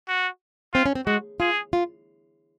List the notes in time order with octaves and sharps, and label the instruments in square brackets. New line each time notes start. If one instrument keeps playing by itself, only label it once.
[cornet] F#4
[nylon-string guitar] C4 [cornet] F4
[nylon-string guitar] C#4
C4
[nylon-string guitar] G#3 [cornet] F#4
[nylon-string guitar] F4 [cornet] G#4
[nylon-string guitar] F4